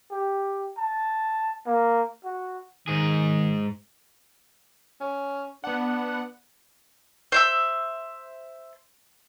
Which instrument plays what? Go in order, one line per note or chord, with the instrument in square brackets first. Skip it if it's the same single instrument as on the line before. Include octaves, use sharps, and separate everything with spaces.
[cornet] G4
A5
A#3
F#4
[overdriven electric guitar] G#2 G#4 [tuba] D#3
[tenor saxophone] C#4
[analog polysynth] B3 F#5 [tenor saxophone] D4
[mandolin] C5 E5 E6